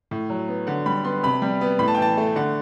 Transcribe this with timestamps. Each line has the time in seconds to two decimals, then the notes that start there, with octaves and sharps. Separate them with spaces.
0.11 A2
0.30 F#3
0.48 B3
0.67 D3 F#5
0.86 G3 B5
1.04 B3 C6
1.23 C3 B5
1.42 G3
1.61 B3
1.79 A2 B5
1.88 A5
1.95 G5
1.98 E3 A5
2.17 A3
2.36 D3 F#5